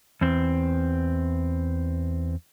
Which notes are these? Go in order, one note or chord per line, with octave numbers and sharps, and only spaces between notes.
E2 C4